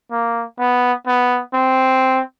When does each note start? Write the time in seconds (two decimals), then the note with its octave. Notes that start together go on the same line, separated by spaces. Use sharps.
0.11 A#3
0.59 B3
1.07 B3
1.54 C4